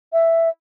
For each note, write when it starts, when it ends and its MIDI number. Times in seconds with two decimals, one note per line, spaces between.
0.13 0.49 76